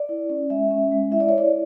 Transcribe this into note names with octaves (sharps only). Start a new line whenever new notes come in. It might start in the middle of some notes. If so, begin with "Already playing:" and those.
Already playing: D5
E4
C#4
G#3 E5
C#4
G#3
E4 E5
D5
C#5
E4
D5